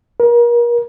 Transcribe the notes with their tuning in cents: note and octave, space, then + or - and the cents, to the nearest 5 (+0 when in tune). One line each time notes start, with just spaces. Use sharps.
A#4 +35